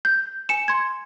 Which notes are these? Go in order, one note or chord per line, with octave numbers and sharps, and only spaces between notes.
G6
G#5 C#7 E7
C6 G#6